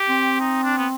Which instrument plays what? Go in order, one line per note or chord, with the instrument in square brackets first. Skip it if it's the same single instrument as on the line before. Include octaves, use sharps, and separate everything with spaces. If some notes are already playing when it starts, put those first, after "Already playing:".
Already playing: [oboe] G4
[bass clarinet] C4
[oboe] D#4
D4
B3